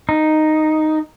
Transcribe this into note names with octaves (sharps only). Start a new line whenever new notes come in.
D#4